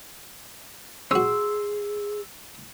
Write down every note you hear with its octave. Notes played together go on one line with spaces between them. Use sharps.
C#4 F#4 G#4 C6 E6